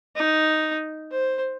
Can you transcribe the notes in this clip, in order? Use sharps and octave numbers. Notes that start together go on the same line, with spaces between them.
D#4
C5